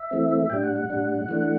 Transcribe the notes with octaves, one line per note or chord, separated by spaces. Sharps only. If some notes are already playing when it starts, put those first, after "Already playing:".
Already playing: E5
E3 A3 C4
A2 G3 D4 G5
F#5
F#5
A2 G3 D4
E3 A3 D4